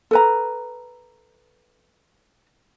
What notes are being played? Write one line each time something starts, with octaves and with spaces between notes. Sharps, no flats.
A4 B4 A#5